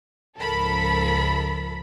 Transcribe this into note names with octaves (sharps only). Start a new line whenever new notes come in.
C#2 G#2 F3 A4 A#4 B5